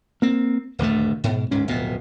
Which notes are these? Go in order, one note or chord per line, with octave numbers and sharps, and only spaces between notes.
A#3 C4
D#1 D2 G2 A3
G#2 B2
D1 G#2 C#4
D1 F2 B2 B3